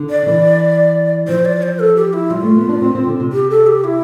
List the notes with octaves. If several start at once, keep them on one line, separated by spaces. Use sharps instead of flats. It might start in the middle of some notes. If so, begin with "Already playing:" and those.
Already playing: D3
D5
E3
F3 C5
D5
C5
A4
G4
E4
G3 F4
A3
B3
D4
C4
C4
D3
C3
G4
A4
G4
E4